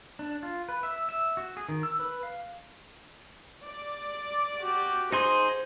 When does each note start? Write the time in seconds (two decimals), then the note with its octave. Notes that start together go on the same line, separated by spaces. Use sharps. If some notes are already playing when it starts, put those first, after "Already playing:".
0.19 D4
0.43 F4
0.68 B4
0.83 E5
1.09 E5
1.37 F#4
1.57 G#4
1.69 D#3
1.83 E6
2.00 B4
2.23 F5
3.64 D5
4.60 F#4 G4
5.12 D#4 G#4 C5 C6